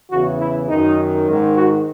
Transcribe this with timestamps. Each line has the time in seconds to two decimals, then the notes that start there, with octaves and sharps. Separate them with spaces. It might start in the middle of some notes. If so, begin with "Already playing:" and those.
0.11 E2 C#3 E3 F#4
0.39 E4
0.68 F#2 D#3 D#4
1.27 G#2 D#3
1.55 F#4